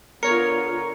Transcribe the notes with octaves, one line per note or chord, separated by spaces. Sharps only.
D3 B3 F4 A#4 C#5 C#7